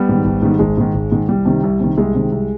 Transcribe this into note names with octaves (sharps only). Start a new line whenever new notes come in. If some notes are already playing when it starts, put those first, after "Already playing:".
Already playing: G3 B3
G#2 D#3
G#1
G#2 D#3
G#1 G#3
G#2 D#3
G#1
G#2 D#3
C2 G3
C3 D#3
C2
C3 D#3
C2 G#3
C3 D#3
C2